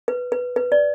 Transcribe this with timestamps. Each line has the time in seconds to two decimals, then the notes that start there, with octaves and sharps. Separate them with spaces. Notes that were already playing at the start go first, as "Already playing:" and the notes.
0.08 B4
0.32 B4
0.56 B4
0.72 D5